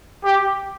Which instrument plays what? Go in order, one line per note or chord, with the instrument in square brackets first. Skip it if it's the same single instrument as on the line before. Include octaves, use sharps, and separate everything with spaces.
[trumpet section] G4